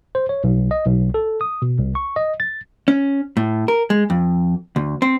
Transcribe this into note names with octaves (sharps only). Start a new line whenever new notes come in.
C5
C#5
B1
D#5
B1
A4
D#6
B2
C2
C#6
D#5
A6
C#4
A2
A#4
G#3
F2
D2
C4